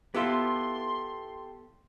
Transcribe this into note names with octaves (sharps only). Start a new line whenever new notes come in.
B3 E4 F4 G4 A4 C6